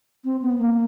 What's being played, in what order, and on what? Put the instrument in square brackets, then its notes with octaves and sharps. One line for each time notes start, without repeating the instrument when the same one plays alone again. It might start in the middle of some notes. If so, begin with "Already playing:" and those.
[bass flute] C4
B3
A#3